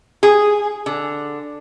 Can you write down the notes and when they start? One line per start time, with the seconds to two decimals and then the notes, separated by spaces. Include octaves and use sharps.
0.23 G#4
0.86 D3